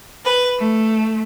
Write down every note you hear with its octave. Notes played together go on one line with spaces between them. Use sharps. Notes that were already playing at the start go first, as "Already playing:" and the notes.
B4
A3